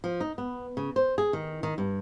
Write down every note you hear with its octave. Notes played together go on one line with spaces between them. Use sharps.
F3
D#4
B3
C#3
C5
G#4
D#3
D#3
G2